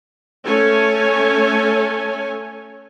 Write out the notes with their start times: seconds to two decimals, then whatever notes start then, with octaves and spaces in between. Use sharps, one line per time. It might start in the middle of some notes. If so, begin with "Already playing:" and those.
0.46 A3 C#4 A4 C#5 G#5